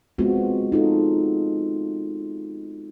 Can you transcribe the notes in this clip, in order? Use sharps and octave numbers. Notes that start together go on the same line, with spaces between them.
G#3 B3 C4 F4 F#4
D#4 F4 G#4 A4